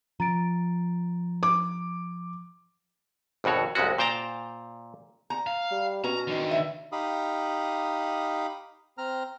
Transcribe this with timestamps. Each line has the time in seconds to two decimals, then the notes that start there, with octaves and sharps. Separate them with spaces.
0.20 F3 A#5 A6 D7
1.43 D6
3.44 G#1 F2 B2 F#4 C#5
3.75 C2 F2 G#3 C#4 F#4
3.98 A#2 C5 G5 A5 A#5
5.30 A#5
5.47 F5
5.71 G3
6.04 B2 C#4 A#5
6.27 D3 D#3
6.51 E5
6.92 D#4 G4 F5 B5 D#6
8.98 C4 A#5 F6